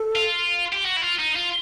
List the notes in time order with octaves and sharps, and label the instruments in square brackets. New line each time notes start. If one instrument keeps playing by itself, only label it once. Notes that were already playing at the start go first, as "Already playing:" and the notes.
Already playing: [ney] A4
[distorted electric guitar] F4
G4
F#4
E4
F4
D#4
F4